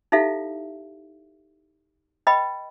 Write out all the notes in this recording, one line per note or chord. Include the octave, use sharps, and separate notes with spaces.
D#4 E4 G4 A4 E5 F5
B4 D#5 G5 B5